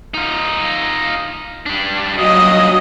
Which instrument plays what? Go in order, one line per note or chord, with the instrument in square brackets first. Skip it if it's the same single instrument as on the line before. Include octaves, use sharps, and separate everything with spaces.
[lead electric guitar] D#4 F4
G3 D4
[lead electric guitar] G2 A#2 [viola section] F#3 D#5